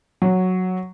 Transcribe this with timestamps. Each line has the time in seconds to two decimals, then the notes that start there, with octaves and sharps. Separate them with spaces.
0.22 F#3